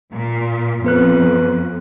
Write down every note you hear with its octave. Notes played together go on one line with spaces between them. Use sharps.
A#2
F2 B3 B4 F#6